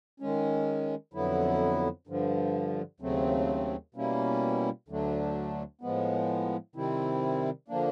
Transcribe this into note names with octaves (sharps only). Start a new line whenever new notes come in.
D#3 G#3 C#4
F2 D3 F#3 B3 E4
G2 D3 F3
D#2 C#3 F#3 A3 C4
B2 G3 A#3 C#4 E4
D2 D3 F#3 A3 D4
A2 F3 G#3 B3
C3 D#3 G3 C4 E4
D3 F3 A#3 D4